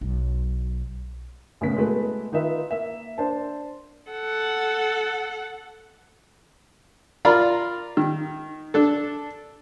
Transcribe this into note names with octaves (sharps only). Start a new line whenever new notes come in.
B1
A#1 A2 C#3 B3 B6
B2 G#3 A3 E4 F#4 B4
D#3 D#4 F4 B4 E5
A#3 E5
D4 C5 A5
A4 F#5
F4 A#4 D5 F5 A#5 B5
D#3
D4 A4